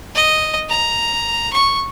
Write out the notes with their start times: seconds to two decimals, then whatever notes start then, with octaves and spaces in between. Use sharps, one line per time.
0.15 D#5
0.69 A#5
1.53 C#6